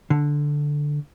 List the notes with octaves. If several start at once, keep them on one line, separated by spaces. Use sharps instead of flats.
D3